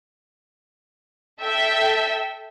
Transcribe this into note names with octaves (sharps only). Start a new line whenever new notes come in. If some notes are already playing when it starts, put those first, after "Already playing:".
A4 E5 G5